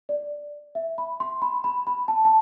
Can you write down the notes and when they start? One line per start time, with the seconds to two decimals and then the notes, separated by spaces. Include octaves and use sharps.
0.09 D5
0.75 E5
0.98 B5
1.20 C6
1.42 B5
1.64 B5
1.87 B5
2.08 A5
2.25 A5